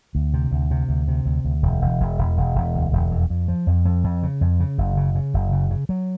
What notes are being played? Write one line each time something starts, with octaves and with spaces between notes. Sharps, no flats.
D2
C3
D2
C3
D2
C3
D2
D2
E1
E1
E1
E1
E1
E1
D2
E1
F2
F2
F3
F2
F2
F2
C#3
F2
C#3
F#1
C#3
C#3
F#1
C#3
C#3
F#3